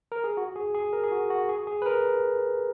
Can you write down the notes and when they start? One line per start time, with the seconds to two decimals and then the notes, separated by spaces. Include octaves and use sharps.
0.12 A#4
0.24 G#4
0.37 F#4
0.56 G#4
0.74 G#4
0.93 A#4
1.03 G#4
1.12 F#4
1.30 F#4
1.49 G#4
1.67 G#4
1.82 B4
1.86 A#4